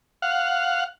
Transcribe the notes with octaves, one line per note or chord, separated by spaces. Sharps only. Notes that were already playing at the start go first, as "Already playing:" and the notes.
F5 F#5